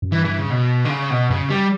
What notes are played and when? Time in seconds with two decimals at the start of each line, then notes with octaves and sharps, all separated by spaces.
0.02 F#2
0.11 G2 E3
0.25 E3
0.38 C#3
0.51 B2
0.85 D3
0.91 C#3
1.11 B2
1.30 F#2 C#3
1.49 G3